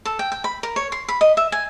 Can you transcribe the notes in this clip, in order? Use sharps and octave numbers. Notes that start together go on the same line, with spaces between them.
A4
G5
G5
B5
A#4
C#5
C6
B5
D#5
E5
G#5